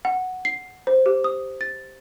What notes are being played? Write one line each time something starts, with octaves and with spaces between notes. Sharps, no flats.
F#5
C7
C5
G4
D#6
A6